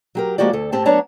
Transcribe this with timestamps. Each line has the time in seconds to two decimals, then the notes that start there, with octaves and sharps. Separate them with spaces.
0.15 F#3 G4 A#4
0.38 F3 G#3 A#3 F#4 G4 D5
0.53 D2 A4
0.72 A2 C4 G4 A5
0.85 F#3 B3 D4 C#5 A5 A#5